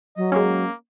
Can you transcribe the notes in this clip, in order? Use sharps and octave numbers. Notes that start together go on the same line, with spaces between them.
F#3 D#5
G#3 A#3 C#4